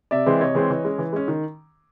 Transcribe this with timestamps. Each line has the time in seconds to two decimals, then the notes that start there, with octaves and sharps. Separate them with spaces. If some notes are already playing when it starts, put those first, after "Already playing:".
0.11 C3 D5 E5
0.26 E3 G#3 C4
0.41 C3 C#5 D#5
0.55 E3 G#3 C4
0.70 E3
0.85 G#3 C#4
0.98 E3
1.13 G#3 C#4
1.28 D#3